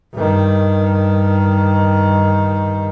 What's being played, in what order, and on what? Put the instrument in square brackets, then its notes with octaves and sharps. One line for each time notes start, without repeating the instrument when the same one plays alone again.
[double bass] G2 D#3